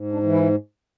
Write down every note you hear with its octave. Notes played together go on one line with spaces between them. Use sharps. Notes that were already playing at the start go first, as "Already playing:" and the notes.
Already playing: G#2
D4
E3
E4